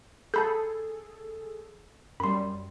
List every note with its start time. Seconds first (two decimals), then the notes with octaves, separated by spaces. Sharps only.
0.34 G#4 A4 A5 B5 G6
2.20 F#2 G3 B5 C6